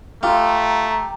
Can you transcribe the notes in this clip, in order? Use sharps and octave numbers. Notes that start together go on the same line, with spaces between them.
A3 F4 G4 A#5 C6